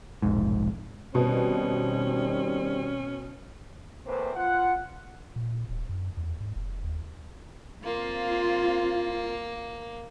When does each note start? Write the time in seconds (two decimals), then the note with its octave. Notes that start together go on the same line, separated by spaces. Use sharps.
0.22 E1 A#1 G#2
1.15 B2 D#3 G3 C4 C#4
4.06 E2 A2 A#3 C4 B4 C5
4.36 F4 F#5
5.36 A#2
5.69 D1
5.89 F#2
6.17 E2
6.40 G#2
6.56 F1
6.84 D#2
7.84 A#3 C4 F4